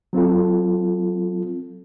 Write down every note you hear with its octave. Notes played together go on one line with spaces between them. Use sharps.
F#3 C4 F4 A4